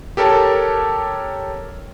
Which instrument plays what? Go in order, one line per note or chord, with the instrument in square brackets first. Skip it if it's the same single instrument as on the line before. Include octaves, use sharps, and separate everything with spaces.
[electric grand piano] G4 A4 A#4 C#5 A5